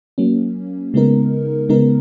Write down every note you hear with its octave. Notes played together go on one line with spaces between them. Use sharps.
F#3 A#3 C#4
C#3 G#3 B3 D#4 A#4
C#3 G#3 B3 D#4 A#4